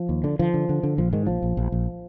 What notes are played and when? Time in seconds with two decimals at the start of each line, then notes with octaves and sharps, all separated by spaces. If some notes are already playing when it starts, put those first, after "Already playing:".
Already playing: F3
0.09 D#2
0.24 D3
0.39 D3 F3
0.54 D3
0.69 D3
0.83 D3
0.98 A#1 F3
1.13 G#2 D#3
1.27 A#1 F3
1.42 A#1
1.57 A#1
1.72 A#1